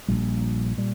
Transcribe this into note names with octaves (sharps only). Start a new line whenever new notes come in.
A#1 A#2 G3
A#2 G3